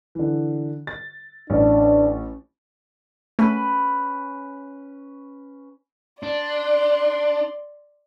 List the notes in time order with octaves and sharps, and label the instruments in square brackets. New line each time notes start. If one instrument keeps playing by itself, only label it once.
[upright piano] D3 E3
A6
[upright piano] A1 [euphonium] D4
[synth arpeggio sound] A3 [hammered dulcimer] C#4 B4 B5
[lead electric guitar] D4 [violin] D5 C6